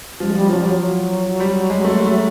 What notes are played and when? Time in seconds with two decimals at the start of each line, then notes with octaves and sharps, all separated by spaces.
0.20 F3 G3
0.27 G#3
0.35 F3 G3
0.50 F3 F#3
0.59 G3
0.64 F3 F#3
0.79 F#3
1.40 G3
1.70 G#3
1.85 A3
2.00 A3